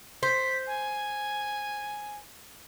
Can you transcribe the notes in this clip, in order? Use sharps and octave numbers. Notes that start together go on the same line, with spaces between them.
C5 B6
G#5